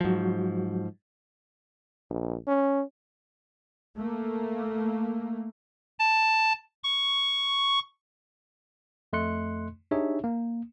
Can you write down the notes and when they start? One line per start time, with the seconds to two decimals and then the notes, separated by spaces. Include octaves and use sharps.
0.01 G#2 F3 F#3 F#4
2.10 A#1
2.47 C#4
3.96 A3 A#3
5.99 A5
6.84 C#6
9.13 F2 A3 D#5 C6 F#6 C#7
9.91 D4 D#4 G4 G#4 C#5 E5
10.24 A#3